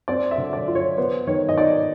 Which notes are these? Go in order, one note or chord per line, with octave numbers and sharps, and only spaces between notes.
C4 D5
E5
D3
D5
F4
C#5
B3 C5
D#3 C#5
D#5
D#4 D5